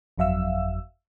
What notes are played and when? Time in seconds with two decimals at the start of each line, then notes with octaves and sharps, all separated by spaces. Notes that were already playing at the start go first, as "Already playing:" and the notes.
0.18 G1 F2 F#3 E5 F5 E6